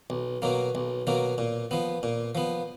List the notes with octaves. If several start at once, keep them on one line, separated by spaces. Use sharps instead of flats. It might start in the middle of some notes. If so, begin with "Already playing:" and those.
B1
B2 F#3 A#3
B1
B2 F#3 A#3
A#2
F3 B3
A#2
F3 B3